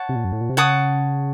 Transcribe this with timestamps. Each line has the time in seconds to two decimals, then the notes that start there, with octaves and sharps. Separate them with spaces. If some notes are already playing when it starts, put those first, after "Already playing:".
Already playing: C#5 F#5 A5
0.09 C3
0.15 A#2
0.24 F#2
0.32 A2
0.41 A#2
0.49 C3
0.57 C#3 C#5 F#5 A5 D#6